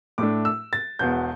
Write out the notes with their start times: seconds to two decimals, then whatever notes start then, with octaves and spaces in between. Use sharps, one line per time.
0.18 A2 A3 D4 D6
0.45 E6
0.73 A6
0.99 E1 E2 B2 G6